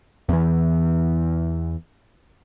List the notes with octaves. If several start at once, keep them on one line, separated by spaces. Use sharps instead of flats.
E2 E3